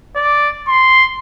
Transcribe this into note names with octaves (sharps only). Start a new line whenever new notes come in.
D5
C6